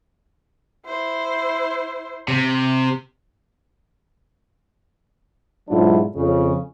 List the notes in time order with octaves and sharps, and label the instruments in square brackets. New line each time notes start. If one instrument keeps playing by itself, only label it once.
[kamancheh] E4 C5
[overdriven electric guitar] C3
[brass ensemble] B1 G#2 F#3 D4 E4 F4
F2 C#3